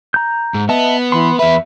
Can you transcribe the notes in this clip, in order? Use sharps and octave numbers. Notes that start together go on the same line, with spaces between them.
A#5 G6
G#2
B3 D#5 E5 A5
E3 B5 C6
E2 B4 E5 B5